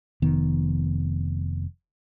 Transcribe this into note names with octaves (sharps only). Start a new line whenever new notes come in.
F1 D#3 B3